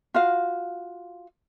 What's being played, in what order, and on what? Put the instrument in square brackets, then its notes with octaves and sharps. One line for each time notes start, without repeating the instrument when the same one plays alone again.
[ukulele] F4 F#4 F5